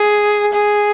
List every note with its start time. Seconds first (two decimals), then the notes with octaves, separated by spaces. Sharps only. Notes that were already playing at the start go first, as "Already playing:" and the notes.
Already playing: G#4
0.53 G#4